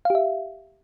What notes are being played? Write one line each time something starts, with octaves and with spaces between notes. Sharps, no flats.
G4 E5 F5